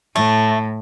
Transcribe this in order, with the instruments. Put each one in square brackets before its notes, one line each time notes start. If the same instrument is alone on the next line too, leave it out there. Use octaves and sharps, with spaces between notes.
[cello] A2 [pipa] A3